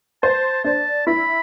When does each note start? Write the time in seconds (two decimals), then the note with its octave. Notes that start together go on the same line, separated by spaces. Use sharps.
0.23 C5 A5
0.64 D4 A5
1.07 E4 B5